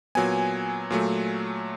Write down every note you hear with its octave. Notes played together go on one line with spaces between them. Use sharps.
A#2 F#3 B3 G#5
A#2 F#3 A3